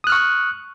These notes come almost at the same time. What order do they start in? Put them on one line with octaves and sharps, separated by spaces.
D#6 F#6 F6 C#6